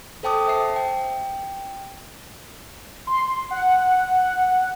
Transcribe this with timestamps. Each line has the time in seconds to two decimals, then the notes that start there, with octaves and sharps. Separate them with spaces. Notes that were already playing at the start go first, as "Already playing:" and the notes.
0.23 A4 C5 G5 A5 D6 D#6
0.47 C5 E5 A5 C7
0.76 G5
3.07 C6
3.51 F#5